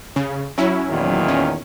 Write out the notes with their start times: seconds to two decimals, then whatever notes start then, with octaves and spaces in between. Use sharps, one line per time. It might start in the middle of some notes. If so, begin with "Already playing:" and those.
0.16 C#3
0.58 F#3 C#4 E4
0.90 E2 A#2 D#3
1.28 C#4